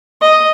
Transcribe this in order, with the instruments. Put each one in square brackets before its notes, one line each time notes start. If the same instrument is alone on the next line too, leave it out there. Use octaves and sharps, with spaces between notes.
[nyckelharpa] D#5